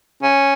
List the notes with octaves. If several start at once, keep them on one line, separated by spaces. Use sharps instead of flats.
C#4